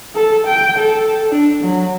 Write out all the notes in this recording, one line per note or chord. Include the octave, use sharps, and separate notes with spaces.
A4
G5
A4
D4
F#3